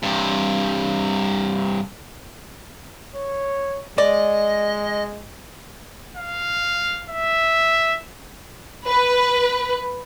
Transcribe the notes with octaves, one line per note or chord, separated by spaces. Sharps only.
G2 C3
C#5
G#3 D5 D#5
F5
E5
B4